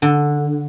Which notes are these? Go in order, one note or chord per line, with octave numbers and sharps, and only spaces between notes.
D3